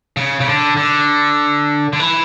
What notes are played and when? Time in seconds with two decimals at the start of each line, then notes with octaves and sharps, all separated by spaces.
0.17 C#3
0.40 C#3
0.47 D3
0.77 D3
1.93 D3
1.99 E3